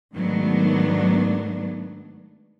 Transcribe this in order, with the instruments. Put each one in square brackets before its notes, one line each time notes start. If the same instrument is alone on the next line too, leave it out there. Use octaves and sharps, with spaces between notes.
[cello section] G#2 D#3 F#3 A3 B3 D4